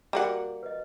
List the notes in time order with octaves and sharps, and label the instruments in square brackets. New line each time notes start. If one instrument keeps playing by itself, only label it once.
[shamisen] G3 A#3 F#5 [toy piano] F#4 G#4
[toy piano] B4 D#5